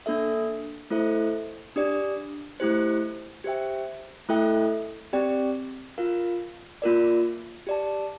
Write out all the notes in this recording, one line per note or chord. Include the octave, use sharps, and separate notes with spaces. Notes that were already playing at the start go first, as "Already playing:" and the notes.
A#3 D4 A4 E5
A3 E4 A4 C5 E5
D4 G4 D5
A3 E4 G4 C5
G4 C5 E5 G5
A3 E4 A4 E5 G5
C4 G4 D5 G5
F4 A#4 F5
A#3 F4 A#4 D5
G4 D5 A5